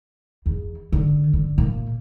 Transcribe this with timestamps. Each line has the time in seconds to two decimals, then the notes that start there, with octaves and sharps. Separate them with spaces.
0.46 E2
0.93 D3
1.33 D3
1.58 A#2